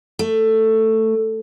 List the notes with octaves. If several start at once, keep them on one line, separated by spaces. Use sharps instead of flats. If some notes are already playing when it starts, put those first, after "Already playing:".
A3